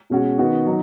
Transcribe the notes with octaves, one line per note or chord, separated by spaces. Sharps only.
B2 G#3 C#4 F#4
D#3 B3 D#4 F#4
F#3 D#4